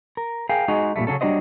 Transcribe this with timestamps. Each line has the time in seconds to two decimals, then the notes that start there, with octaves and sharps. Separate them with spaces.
0.17 A#4
0.49 G#4 A#4 F5 G5
0.68 G#3 D#4 F#4 G#4
0.96 A#2 C#3 G3 A3
1.07 C#3 F#3 C#4 A4
1.21 F#3 G3 D4 F#4 C5 D#5